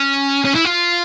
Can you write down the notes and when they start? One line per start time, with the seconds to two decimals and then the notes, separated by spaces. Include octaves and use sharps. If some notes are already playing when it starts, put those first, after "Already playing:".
Already playing: C#4
0.44 C#4
0.55 E4
0.65 F4